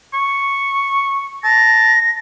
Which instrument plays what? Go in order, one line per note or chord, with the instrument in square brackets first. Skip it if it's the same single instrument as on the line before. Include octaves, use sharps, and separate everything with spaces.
[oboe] C#6
[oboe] A5 [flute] A#6